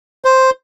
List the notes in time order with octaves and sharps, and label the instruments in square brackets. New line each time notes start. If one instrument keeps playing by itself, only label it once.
[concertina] C5